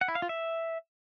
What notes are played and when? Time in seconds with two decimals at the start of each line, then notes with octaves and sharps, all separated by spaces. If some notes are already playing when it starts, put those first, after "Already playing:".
0.01 F#5
0.08 E4
0.15 F5
0.22 F4
0.29 E5